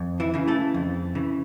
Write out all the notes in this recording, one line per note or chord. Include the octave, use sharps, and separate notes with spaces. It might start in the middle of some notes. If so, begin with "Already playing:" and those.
Already playing: F2
E3 E4
C#3 E3
A3 A4
F2
C#3 E3